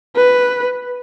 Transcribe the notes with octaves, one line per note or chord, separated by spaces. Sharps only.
B4